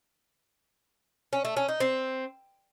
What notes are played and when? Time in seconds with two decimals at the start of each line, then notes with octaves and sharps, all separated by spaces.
1.33 C#4
1.45 A3
1.57 C#4
1.68 D#4
1.80 C4